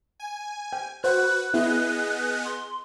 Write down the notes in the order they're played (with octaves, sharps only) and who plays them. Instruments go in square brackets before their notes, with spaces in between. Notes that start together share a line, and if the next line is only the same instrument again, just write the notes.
[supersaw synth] G#5
[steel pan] G5
[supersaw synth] F#4 B4 [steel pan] C5 F#5 [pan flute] F#6
[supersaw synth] B3 G#4 D#5 [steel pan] E4
[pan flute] C6